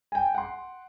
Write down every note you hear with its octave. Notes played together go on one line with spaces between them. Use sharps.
G5 G#5
F#5 C6